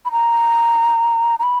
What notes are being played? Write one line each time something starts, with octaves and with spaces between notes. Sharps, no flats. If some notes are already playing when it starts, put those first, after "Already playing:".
B5
A#5
A#5
B5